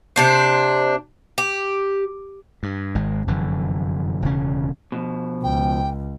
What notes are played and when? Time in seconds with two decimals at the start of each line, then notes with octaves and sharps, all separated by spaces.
0.16 C3 D4 C5
1.38 G4
2.63 G2
2.95 G#1 G#3
3.27 F1 F#2 D3 E3
4.22 E1 D2 C#3 C#4
4.92 B2 F3
5.43 C#2 G5